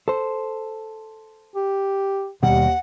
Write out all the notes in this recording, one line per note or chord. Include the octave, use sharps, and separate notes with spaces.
A4 C5
G4
D#2 B2 D#3 G3 F#5